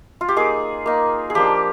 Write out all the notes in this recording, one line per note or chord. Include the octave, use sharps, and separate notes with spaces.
F4
G4
A#3 D#4 G#4
A#3 D#4
G#4
F3 A#3 D4 G4